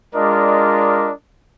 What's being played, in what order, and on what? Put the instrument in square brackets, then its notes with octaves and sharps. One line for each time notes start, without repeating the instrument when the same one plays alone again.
[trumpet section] G#3 D4 F4 A#4 D5 D#5